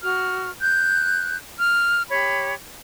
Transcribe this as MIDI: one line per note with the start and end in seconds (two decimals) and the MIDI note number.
0.02 0.51 66
0.02 0.51 89
0.61 1.36 90
0.61 1.36 91
1.60 2.02 89
2.10 2.54 67
2.10 2.54 73
2.10 2.54 83